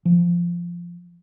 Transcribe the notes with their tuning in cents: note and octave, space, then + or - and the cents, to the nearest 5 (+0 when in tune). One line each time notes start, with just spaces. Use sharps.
F3 -10